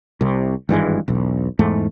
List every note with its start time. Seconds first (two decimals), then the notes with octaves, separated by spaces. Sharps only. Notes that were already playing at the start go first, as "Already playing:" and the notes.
0.21 C2 C3
0.69 G#1 G2 E3 G#3
1.08 E1 B1
1.59 E2 G#2 A3